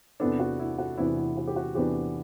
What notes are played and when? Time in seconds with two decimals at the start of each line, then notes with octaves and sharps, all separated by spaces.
0.20 E2 C3 E3 B3 D4 A4
0.40 F#4
0.59 E4
0.78 F#4
0.97 E2 C3 E3 B3 D4 E4
1.17 E4
1.37 F#4
1.48 G4
1.56 F#4
1.75 E2 C3 E3 B3 D4 G4